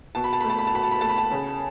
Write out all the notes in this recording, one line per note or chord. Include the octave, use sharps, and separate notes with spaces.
B2 A5
B5
A5
B5
A3
A5
B5
A5
B2 B5
A5
B5
A3 A5
B5
A5
C#3